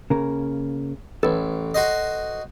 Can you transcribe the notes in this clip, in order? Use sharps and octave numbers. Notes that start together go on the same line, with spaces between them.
C#3 A#3 A#4
A1 A4 B4 C#5
F#4 C5 D#5